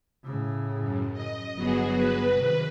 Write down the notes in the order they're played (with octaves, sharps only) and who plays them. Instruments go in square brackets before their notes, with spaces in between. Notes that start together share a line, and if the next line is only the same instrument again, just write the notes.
[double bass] A2 C#3
[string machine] F#2
D#5
[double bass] G1 B3 [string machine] F#3 F#4 G#4
[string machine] B4
[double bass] C3 D#3